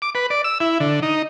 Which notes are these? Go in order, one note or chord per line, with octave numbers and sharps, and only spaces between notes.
D6
B4
D5
E6
E4
D3
D#4